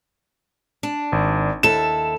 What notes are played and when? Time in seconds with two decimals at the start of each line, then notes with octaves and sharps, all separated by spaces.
0.83 D4
1.12 G#1
1.63 D#2 E4 A4 E7